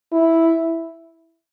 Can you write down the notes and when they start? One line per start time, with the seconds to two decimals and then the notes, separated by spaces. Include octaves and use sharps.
0.13 E4